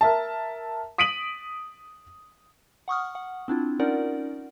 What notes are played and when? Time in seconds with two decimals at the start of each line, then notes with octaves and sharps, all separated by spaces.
0.01 A#4 E5 A5
0.98 D#6 B6 D7 D#7 F#7
2.88 F#5 C#6 D#6 F6
3.15 F#5
3.48 C4 D4 E4 F4
3.79 C#4 D#4 F4 A#4 D5 F#5